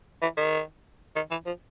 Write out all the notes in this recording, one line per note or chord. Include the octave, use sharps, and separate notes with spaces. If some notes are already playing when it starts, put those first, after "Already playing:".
E3
D#3
D#3
E3
F3